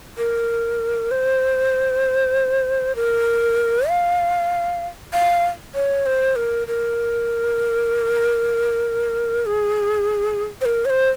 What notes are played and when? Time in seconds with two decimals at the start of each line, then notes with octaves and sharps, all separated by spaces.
0.18 A#4
1.11 C5
2.96 A#4
3.88 F5
5.13 F5
5.75 C#5
6.06 C5
6.36 A#4
6.68 A#4
9.46 G#4
10.61 C5
10.65 A#4
10.85 C#5
10.90 C5